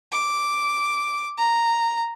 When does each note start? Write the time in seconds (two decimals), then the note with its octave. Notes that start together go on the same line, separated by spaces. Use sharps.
0.12 D6
1.38 A#5